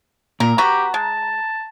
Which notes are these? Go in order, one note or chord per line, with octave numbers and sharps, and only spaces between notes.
A#2 A#4
B3 F#4 G4 A#5
G#3 A5